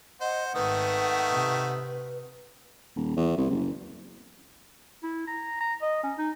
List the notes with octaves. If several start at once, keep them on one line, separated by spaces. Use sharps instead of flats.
C5 D#5 F#5
G#1 D#3 A3 B4 D#6
C3
D#1
E2
C2
F#1
E4
A#5
A#5
D#5
C#4
D#4